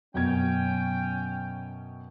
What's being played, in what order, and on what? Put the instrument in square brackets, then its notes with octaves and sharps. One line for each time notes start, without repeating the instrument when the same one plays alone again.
[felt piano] F#2 B2 G#6 [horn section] C#4 G5